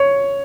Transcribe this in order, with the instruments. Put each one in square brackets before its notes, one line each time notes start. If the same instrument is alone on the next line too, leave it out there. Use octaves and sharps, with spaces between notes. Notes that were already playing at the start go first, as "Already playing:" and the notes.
Already playing: [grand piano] C#5